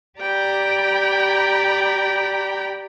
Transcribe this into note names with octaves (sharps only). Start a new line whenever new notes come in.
G4 D5 G5 A#5 B5